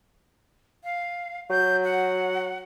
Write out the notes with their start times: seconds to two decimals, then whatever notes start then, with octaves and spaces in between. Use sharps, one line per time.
0.84 F5
1.50 F#3 G6
1.84 F#5